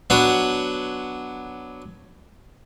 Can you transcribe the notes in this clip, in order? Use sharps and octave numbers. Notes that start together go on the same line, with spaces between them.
F#3 B3 D4 C#5 F#5